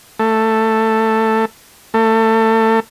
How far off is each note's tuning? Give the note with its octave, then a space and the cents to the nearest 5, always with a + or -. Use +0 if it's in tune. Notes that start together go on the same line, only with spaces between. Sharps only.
A3 +10
A3 +25